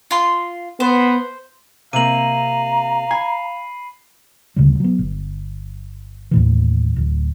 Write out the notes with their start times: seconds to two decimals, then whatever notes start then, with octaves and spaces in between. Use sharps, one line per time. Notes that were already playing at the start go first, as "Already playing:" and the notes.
0.11 F4 C6
0.80 B3 C5
1.93 C3 A#3 F5 A#5 D#7 F#7
3.11 G#5 B5 C7
4.56 D2 C#3 G3
4.80 F#3 B3
4.99 G1
6.31 D#2 A2 E3
6.96 D1